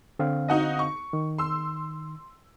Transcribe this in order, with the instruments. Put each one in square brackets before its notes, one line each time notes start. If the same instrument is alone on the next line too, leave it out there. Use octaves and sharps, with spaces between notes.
[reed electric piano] D3 C4 F5
[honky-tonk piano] D#4 F#4 D#5
C#6
[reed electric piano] D#3
[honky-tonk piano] C6 E6